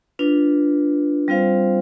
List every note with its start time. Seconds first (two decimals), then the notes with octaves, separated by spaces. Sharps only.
0.19 D4 F4 B4
1.28 G3 C4 F4 C5 F5